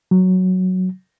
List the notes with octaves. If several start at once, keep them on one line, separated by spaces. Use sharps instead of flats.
F#3